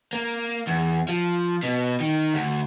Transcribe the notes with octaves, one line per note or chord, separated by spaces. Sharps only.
A#3
E2
F3
B2
D#3
D2